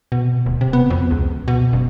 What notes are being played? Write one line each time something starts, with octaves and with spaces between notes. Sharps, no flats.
B2
D1
C3
B3
F2
C#2
B2
F#1